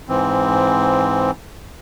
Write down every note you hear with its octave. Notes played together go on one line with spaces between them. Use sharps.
G#2 E3 C4